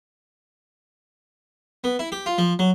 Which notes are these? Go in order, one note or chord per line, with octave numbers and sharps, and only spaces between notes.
B3
E4
G4
F4
F3
F#3